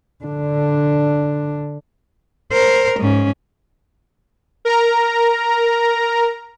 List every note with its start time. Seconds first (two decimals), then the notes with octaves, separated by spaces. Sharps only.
0.24 D3 D4
2.52 A#4 C5
2.99 G#2 C#4
4.65 A#4 A#5